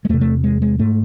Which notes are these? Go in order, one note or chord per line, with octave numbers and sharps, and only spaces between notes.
G#3
E2 C3 A3
A3
G#3
G#3
G#2 A3